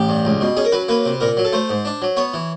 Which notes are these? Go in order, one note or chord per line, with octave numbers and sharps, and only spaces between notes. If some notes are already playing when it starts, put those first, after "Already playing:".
Already playing: A1 G4
G2
C#2
B2
C#4 G#4
A#4
F#3 B4
A#3 B4
C3
A#2 A#4
F#3
A4
A3 C5
G#2
D4
F#3
B3 C#5
E3